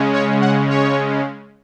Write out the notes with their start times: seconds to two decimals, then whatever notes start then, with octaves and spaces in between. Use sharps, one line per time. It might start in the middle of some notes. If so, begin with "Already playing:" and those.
Already playing: C#3 G#3 C#4
0.13 C#5
0.41 F#5
0.70 C#5